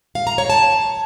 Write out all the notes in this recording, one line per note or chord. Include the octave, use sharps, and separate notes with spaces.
F5
A#5
C#5
A5